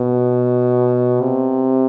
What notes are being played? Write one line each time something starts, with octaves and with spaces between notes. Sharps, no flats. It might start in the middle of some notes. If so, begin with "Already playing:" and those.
Already playing: B2
C3